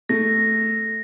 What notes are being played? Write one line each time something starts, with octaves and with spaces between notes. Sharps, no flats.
A3 A#6